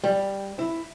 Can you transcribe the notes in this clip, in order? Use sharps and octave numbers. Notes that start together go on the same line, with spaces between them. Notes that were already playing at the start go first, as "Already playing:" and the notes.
G3
E4